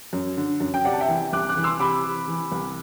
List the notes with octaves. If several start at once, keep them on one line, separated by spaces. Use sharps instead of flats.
F#2
D3
F#2
G5
C3 D5 F#5
A5
E5 G5
E3
C2 D6 F#6
D6 F#6
E3
C6 E6
C3 B5 D6
C3
E3
C2